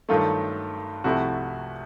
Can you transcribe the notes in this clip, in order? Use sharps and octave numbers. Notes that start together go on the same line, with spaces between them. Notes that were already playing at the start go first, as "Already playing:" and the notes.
G2 D#3 F#3 A3 F4
C2 C3 F3 A3 E4 F#4